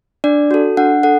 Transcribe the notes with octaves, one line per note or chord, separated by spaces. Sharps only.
D4 D5
F#4 A4
D4 F#5
A4 F#5